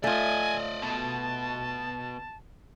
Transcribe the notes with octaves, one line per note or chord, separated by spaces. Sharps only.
A3 F4 D5 D#5 G#5
B2 A5